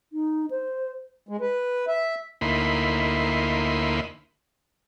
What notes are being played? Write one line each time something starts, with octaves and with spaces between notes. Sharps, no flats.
D#4
C5
G#3
B4
E5
D2 A#3 D#4 E4 B5 C6